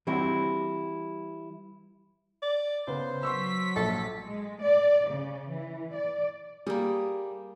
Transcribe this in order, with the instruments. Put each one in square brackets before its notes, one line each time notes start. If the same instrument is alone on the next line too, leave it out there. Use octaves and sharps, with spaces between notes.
[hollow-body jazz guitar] E3 G3 C4 E4 F#4
[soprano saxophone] D5
[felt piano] C#3 B3 [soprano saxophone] C5
[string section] F#3 B6 [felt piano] C6 C#6 E6
[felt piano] A#1 [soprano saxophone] A4
[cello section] G#3
D5
C#3
E3
D5
[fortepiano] G3 [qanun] A#3 G#4